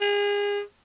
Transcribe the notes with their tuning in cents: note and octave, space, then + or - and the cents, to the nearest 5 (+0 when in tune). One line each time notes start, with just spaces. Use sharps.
G#4 -30